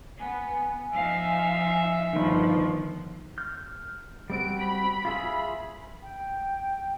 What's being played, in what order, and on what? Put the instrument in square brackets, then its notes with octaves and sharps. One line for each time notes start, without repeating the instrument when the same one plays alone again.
[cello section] B3 [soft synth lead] G#5
[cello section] F3 D#4 F5 [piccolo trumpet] E5
[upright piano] G1 D#3 [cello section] F3
[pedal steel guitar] F6 G6
[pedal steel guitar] G3 C4 F#4 [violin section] D7
[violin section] B5
[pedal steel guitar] F4 G#4 E5
[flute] G5